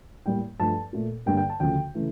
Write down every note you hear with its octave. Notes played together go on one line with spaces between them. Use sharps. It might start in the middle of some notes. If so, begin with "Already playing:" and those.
A2 G3 A#3 G5
G2 F3 A3 A5
A#2 A3
G2 D3 G3 A#3 G5
G5
A5
D2 C#3 F3 A3 G5
C#3 E3 A3